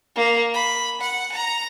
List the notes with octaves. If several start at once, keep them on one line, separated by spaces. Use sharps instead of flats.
A#3
B5
F#5
A#5